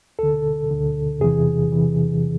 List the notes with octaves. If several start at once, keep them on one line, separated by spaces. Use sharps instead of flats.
D2 D3 A4
D2 D3
E2 C3 E3 G#4
C3 E3